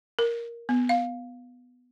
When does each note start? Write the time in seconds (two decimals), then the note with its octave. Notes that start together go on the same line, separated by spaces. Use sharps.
0.19 A#4
0.69 B3
0.89 F5